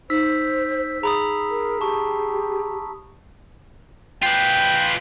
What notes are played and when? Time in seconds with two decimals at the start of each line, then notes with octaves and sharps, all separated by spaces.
0.10 D#4 C5 E6 B6
1.03 G#4 A#5 B5 D#6
1.50 A#4
1.81 G4 A5 C#6
4.23 F4 B4 G5